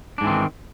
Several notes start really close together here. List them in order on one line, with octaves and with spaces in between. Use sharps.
D4 G#2 E3 C4 D#3